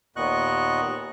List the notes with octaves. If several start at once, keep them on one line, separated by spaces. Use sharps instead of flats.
D#2 A#2 B3 D#5 C#6 F#6